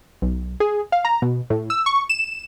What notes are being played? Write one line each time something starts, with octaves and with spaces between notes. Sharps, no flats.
B1
G#4
F5
A#5
B2
A2
E6
C#6
E7